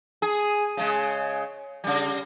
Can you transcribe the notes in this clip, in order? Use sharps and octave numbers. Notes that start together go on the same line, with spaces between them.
G#4
C#3 G#3
C#3 G3